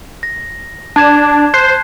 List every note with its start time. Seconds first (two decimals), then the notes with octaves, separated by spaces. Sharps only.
0.23 A#6
0.96 D4 A5 G#6 E7
1.54 C5 F#6 G6 C7